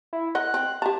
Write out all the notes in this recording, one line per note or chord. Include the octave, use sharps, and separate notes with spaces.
E4
A#4 D#5 F#5 F#6
C4
G4 A5 A#5